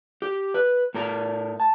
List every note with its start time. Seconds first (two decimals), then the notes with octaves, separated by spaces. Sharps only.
0.22 G4
0.54 B4
0.94 A2 A#4 A#5
1.60 A5